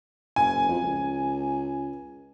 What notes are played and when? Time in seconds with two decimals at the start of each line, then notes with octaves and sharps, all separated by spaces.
0.36 F#1 G#5
0.69 F2
0.83 C#2